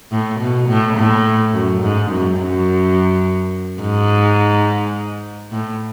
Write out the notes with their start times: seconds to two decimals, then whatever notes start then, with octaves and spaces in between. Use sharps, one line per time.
0.12 A2
0.40 B2
0.69 A2
0.97 A2
1.53 F#2
1.82 G#2
2.11 F#2
2.39 F#2
3.81 G#2
5.52 A2